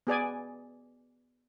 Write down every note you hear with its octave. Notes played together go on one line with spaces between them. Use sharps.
B3 G#4 D5 G#5